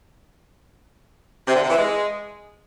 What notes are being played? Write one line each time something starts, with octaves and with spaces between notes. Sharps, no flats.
C3
D3
C3
E3
G#3